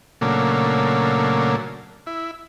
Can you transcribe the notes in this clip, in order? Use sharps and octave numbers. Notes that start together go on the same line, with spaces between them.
A#2 C#3 F#3 A3 A#3 D4
E4